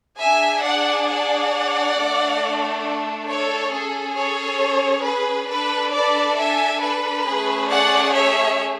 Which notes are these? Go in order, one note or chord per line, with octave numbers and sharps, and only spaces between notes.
D4 G#4 E5 G#5
D5 F#5
D5 F#5
A3 D4 A4
A4 C#5
C#4 G#4 A4
A4 C#5
B4
D4 A4 B4
B4 D5
E5 G#5
B4
A3 C#4 G#4
D5 F#5
C#5 E5